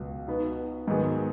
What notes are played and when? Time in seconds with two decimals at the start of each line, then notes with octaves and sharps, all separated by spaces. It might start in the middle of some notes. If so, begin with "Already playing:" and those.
Already playing: C#2 B2 F#3
0.28 B2 B3 D#4 F#4
0.88 G#2 D#3 F#3 B3 G#4